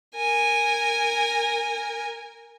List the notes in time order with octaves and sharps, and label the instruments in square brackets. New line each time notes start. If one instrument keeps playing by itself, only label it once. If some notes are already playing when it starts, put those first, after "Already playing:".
[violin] A#4 G#5